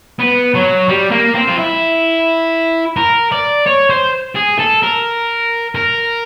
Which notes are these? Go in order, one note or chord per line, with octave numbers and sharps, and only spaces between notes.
B3
F#3
G3
A#3
C4
F4
E4
A#4
D5
C#5
C5
G#4
A4
A#4
A#4